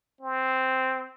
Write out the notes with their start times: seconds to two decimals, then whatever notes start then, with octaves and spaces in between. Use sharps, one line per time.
0.21 C4